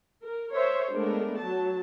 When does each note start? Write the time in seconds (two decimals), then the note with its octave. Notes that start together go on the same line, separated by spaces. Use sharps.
0.21 A#4
0.52 A#4 C5 C#5 E5
0.90 G#3 A3 B3 D4 A#4
1.40 F#3 A5